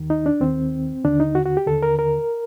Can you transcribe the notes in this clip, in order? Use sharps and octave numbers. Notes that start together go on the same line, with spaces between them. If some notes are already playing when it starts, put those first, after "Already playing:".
Already playing: D#2 D#3
D#4
D4
D#2 D#3 C4
D#2 D3 D4
D#4
F#4
F#4
G4
D#2 D3 A4
A#4
A#4